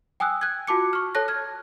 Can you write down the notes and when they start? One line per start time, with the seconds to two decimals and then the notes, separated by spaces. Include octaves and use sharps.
0.20 G5 G#5 D#6 E6 F#6
0.41 F#6 G#6
0.67 F4 F#4 A5 D6 C#7
0.93 C#6 F6
1.15 A4 C#5 A5 F#6 A#6
1.28 F6 G#6